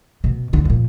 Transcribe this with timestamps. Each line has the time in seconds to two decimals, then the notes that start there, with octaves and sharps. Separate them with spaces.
0.24 B2
0.53 D#2 D3
0.65 F2 A#2